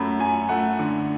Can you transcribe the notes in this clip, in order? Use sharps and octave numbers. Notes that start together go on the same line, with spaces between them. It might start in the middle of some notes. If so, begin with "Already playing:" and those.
Already playing: F#2 A3 B5
F#2 G#5
A3 F#5
D3